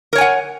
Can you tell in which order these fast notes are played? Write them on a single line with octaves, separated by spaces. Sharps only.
A#4 C#5 G#5 F#5